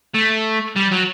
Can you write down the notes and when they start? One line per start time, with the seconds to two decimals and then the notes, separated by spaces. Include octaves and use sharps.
0.14 A3
0.76 G3
0.91 F#3